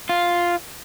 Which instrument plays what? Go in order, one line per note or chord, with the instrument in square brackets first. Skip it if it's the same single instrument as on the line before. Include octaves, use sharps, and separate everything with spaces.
[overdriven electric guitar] F4